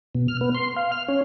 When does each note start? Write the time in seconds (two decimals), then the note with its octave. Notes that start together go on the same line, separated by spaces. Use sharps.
0.15 B2
0.28 F6
0.41 B3
0.54 C6
0.76 F5
0.92 F6
1.08 C#4